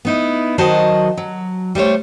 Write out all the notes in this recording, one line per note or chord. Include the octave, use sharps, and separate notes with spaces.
B3 D#4 E4
D#3 F#3 F#4 C5 D#5 A5
F#3
G3 A3 C5 C#5